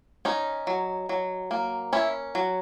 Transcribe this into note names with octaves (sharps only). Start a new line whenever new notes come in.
C#4 D#4
F#3
F#3
A#3
C#4 E4
F#3